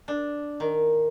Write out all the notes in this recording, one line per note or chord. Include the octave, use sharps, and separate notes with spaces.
D4
D#3